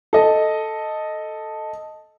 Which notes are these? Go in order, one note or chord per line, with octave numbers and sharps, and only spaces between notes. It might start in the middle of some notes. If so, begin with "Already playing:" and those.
A4 D#5